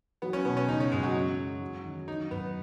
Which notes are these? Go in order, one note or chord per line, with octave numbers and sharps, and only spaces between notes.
F#3 B3
C#4
B2 B3
C#4
C#3 D#4
C#4
F#2 G#3
F#3
C#4
G#3
F#3
D#3
F#3 D#4
F#2 B3